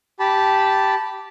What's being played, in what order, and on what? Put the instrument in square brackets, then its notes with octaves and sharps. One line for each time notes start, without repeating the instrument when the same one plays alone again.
[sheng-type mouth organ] G4 A5 B5